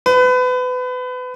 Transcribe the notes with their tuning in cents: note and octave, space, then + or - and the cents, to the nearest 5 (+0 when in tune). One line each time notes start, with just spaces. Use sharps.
B4 +30